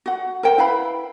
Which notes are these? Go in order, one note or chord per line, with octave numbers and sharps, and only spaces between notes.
F#4 F#5
A#4 C5 F#5 G5
E4 B4 F5 B5